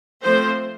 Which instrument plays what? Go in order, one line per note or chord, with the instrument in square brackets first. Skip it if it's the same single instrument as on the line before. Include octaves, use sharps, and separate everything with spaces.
[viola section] F3 A3 C4 C5